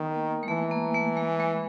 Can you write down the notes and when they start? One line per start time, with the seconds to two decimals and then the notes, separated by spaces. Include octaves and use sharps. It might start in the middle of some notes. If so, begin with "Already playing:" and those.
Already playing: D#3 B3
0.14 A#3
0.43 G#3
0.48 E3 A3
0.71 A#3
0.94 A3
1.17 G#3
1.40 G#3